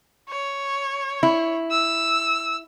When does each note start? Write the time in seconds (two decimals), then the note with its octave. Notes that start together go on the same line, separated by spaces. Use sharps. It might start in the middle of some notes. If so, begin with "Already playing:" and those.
0.29 C#5
1.23 E4
1.70 E6